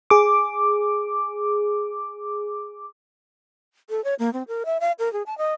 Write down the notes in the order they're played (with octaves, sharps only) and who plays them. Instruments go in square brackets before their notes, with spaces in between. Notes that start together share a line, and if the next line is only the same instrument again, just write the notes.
[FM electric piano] G#4 D6
[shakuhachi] A4
C#5
A#3
C4
A#4
E5
F5
A#4
G#4
A5
D#5